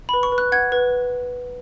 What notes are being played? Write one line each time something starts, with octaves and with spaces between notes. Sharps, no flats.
B4 B5
C#6
B4
F#6
F#5 G#6
B4